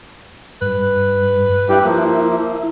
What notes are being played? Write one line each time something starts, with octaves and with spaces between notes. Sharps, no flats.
G2 B4
G2 G3 E4 G4
F3 A#3